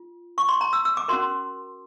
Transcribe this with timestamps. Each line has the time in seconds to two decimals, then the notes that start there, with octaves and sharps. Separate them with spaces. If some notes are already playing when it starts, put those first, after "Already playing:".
Already playing: F4
0.38 C#6
0.49 C6
0.61 A#5
0.73 E6
0.85 E6
0.97 D6
1.08 C#4 F#4 A#4 C6